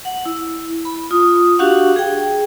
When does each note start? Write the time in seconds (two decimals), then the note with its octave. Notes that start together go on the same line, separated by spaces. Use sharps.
0.05 F#5
0.26 E4
0.85 B5
1.11 F4 D#6
1.59 D4 F#4 G4 F5 F#5 C#6
1.96 G#4 G5